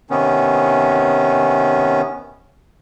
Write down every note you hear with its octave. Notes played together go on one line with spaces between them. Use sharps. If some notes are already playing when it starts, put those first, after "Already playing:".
C3 D#3 B3 C#4